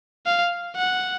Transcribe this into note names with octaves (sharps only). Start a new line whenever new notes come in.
F5
F#5